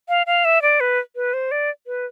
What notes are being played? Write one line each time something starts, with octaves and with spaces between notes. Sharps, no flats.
F5
F5
E5
D5
B4
B4
C5
D5
B4